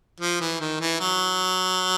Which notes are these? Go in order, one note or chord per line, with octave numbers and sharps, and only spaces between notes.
F3
E3
D#3
E3
F#3